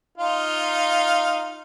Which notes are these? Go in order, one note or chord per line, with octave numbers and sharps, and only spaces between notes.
D#4 F4 F5